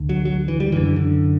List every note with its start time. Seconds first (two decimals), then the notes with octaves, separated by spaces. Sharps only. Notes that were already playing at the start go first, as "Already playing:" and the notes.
Already playing: D2 D3
0.09 F#3
0.25 F#3
0.48 E3
0.60 G3
0.72 F#2 D3 E3
0.96 D3